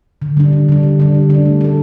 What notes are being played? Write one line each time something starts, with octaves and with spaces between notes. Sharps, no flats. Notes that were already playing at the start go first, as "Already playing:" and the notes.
D3
G3 D4
D3
G3 D4
D3
G3 D4
D3
G3 D4
A3
D4 A4